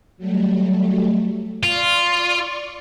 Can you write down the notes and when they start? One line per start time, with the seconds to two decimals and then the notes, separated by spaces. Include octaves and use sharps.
0.18 F#3 G3 A3
1.63 F4 D5 C6 C#6